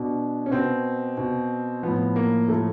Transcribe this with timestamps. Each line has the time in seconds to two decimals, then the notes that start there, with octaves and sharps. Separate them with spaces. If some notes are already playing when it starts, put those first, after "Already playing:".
Already playing: B2 D4
0.46 C#4
0.51 B2 C4
1.17 B2
1.83 A2 F3 B3
2.16 A#3
2.48 A2 F3 A3